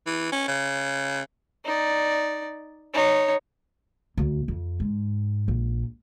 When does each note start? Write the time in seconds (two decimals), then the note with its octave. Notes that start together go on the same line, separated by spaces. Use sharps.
0.06 E3
0.32 C#4
0.48 C#3
1.65 D#4 D5
2.94 D#4 C#5
4.17 D2
4.48 F2
4.80 G#2
5.48 A#1